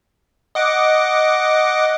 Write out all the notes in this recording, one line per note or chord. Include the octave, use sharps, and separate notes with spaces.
D#5 F#5 D6